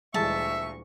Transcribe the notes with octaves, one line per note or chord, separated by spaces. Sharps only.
D2 A#2 E3 G3 G#3 E5 A5 C#6